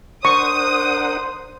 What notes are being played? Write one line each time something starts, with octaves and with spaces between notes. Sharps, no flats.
D4 A#4 C5 F#5 C#6 D#6